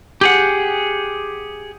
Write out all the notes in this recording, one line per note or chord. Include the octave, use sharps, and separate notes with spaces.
G4 G#4 F#5